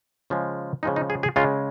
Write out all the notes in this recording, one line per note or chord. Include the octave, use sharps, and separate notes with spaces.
C#3 F3 G#3
C#3 F3 G#3 D#4
D#4
G#4
G#4
C#3 G#3 F4